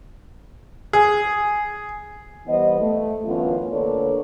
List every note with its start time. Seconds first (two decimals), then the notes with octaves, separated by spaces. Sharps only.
0.93 G#4
2.47 E3 G3 B3 C5 D#5
2.80 A3
3.25 F#2 D3 E3 B3 C#4 F4
3.72 D3 A#3 A4 B4 C#5 D5